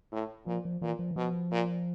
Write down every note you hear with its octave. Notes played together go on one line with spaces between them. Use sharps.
A2
A#2 F3
F3
A#2 E3
F3
E3
B2 F3
A#2